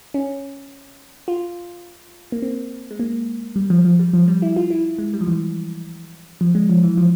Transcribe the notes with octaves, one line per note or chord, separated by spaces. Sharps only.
C#4
F4
A#3
C4
G#3
A#3
G3
F3
F3
G3
F3
G3
E4
F4
E4
G#3
G3
F3
E3
F3
G#3
F3
E3
F3